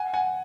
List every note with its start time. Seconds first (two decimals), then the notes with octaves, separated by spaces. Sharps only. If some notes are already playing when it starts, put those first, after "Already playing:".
Already playing: F#5 G#5
0.14 F#5 G#5